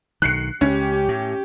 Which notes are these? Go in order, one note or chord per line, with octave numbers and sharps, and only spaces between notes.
B1 D#3 F#6 C7 C#7
C#2 C#4 G4
A2